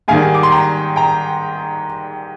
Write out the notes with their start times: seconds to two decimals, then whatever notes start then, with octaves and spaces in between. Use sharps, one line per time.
0.08 G#2 D#3 G3 F5 G#5
0.34 D6
0.43 C6
0.52 G5 A#5
0.96 G5 A#5